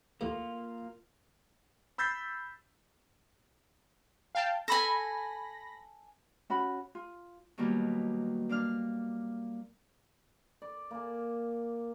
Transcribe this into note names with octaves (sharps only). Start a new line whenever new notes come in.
D#2 A2 A#3 F4
B5 E6 G6 A6 B6 C7
F5 G5 A5
A4 G#5 B5 A#6
C#4 F#4 B5
F4
B2 D#3 F#3 G3 A#3
A#3 D4 F5 F6
D5
A#3 G#5